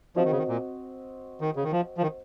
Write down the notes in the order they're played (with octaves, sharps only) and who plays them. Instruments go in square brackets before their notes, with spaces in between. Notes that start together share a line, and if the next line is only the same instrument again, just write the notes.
[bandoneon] F3 [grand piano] C4 F#4 C5 D#5
[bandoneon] D#3
C#3
D#3
A#2
D#3
C#3
D#3
F3
F3
D#3